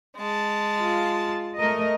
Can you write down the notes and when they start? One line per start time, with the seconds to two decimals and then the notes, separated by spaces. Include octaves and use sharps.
0.17 G#3 A5
0.81 F4
1.58 A3 A#4 D#5